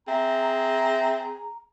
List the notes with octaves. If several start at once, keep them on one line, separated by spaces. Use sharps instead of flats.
C4 G#4 E5 A#5